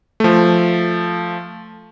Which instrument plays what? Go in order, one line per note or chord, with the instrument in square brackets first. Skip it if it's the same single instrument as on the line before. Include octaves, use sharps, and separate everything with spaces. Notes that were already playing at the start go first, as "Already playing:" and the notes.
[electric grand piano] F3 A3